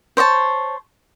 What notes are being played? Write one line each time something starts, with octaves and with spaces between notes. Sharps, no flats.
C5 C#5 D#5 A5